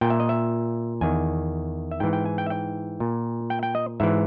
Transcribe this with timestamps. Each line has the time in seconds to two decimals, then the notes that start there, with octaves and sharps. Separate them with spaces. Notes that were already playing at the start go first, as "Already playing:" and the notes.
0.01 A#2 G5
0.10 E5
0.20 D#5
0.29 E5
1.01 E2 D#3 G#5
1.91 E5
2.00 G#2 E3 G5
2.13 G5
2.26 G#5
2.38 G5
2.46 E5
2.50 G5
3.00 A#2
3.50 G5
3.63 G5
3.75 D#5
4.00 G#2 E3 E5